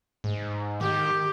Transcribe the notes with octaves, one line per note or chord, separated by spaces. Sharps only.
G#2
D#3 G4